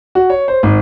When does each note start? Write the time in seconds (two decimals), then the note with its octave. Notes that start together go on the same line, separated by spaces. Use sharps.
0.15 F#4
0.30 C#5
0.48 C5
0.63 G#1